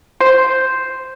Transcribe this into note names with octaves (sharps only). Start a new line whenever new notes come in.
C5